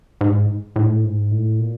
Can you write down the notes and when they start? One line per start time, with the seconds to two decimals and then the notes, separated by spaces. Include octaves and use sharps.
0.21 G#2
0.76 A2
1.04 G#2
1.31 A2
1.59 A#2